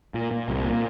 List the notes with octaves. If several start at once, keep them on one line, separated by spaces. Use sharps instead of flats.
A#2
A#2
C2
A#2
A#3